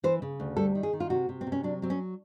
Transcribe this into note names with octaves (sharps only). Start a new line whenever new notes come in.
E3 C5
C#3
D2
G3 A4
D#3
G#4
D#3
F4
C3 F#4
C3
C4
C3
C#4
F#3 D4
F#3 C4
C#4